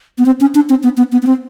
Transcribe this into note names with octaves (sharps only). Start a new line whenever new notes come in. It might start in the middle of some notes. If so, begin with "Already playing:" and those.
B3
C4
C#4
D4
C4
B3
B3
B3
B3
C4